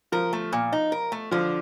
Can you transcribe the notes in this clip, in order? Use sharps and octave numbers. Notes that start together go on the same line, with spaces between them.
F3 A#4
A3
A#2
D#4
A#4
A3
D3 F3